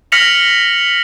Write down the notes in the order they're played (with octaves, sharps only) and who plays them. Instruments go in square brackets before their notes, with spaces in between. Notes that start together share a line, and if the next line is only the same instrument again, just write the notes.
[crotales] F6 A#6 B6 C#7 F7 F#7